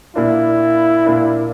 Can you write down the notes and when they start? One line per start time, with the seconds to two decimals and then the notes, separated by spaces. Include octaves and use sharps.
0.15 A#2 A#3 D4 E4
1.06 A#2 A#3 D4